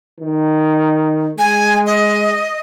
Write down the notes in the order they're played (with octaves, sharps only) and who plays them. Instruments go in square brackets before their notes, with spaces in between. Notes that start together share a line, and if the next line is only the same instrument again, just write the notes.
[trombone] D#3
[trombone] G#3 [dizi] G#5
[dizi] D#5